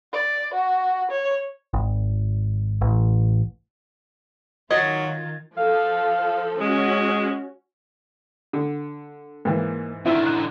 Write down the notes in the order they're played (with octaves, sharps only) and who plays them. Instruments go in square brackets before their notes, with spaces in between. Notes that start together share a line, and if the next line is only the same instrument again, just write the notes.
[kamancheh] D5
F#4
C#5
[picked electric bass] G#1
A1
[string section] D#3 F4 [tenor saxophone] F#3 [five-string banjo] D#5 [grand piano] G#6 A6
[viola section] F3 A4 [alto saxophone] F5
[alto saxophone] G#3 [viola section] C#4 F#4
[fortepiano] D3
[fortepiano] G#2 E3 [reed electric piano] A#3
[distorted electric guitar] D3 D#3 [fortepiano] C4 [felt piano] E4 [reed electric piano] E5 E6
[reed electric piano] F#6